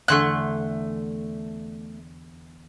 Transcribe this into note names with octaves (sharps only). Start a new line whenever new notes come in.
E2 D3 A3 G#5 C6 F#6